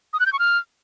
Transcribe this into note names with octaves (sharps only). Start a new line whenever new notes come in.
D#6
F#6
G6
C#6
F6